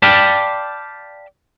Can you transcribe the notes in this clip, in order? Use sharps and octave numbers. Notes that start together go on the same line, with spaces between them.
D5 F5 G5 A5 B5